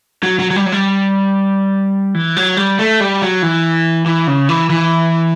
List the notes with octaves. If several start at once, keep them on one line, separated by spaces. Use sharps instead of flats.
F#3
F#3
F#3
G3
F#3
G3
E3
F#3
G3
A3
G3
F#3
E3
E3
C#3
E3
E3